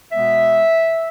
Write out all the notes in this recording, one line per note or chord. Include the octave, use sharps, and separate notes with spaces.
B2 G#3 B3 E5